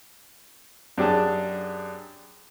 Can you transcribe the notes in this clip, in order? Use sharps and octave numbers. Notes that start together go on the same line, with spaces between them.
F#2 D4 G4 G#4 A5